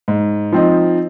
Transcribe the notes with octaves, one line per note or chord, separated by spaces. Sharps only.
G#2
F3 C4 D#4